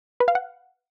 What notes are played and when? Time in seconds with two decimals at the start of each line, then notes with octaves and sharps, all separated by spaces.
0.20 B4
0.28 F5
0.35 F#5